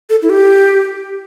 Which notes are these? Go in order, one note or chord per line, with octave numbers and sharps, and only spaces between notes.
A4
E4
G4